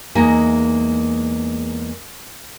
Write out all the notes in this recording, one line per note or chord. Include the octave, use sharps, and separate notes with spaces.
E2 G#3 A#3 D#4 E5 G#5